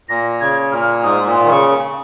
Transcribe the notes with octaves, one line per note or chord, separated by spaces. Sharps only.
A#2 A#6
C#3 G#6
A#2 F6
G#2 D#6
A#2
D#3
C#3 C#6